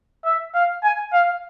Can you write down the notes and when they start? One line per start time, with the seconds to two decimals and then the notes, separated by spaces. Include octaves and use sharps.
0.25 E5
0.54 F5
0.83 G#5
1.13 F5